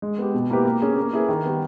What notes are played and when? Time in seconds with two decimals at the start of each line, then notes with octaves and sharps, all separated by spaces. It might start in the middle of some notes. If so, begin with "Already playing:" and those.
0.02 G#3
0.18 B3 G4
0.34 B2
0.50 A#3 E4 G4 B4
0.65 A#3
0.82 C#4 G#4
0.97 A#3
1.13 E4 G#4 B4
1.29 D#3
1.45 G3 B3